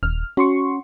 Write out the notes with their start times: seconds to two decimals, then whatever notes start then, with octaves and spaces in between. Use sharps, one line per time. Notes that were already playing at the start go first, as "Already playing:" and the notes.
0.03 D#1 F6
0.37 C#4 F#4 C6 C#6